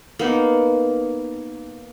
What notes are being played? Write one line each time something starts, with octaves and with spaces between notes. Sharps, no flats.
A#3 B3 D#4